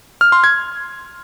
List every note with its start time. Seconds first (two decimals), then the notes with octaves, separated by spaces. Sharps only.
0.21 F6
0.32 C6
0.44 G#6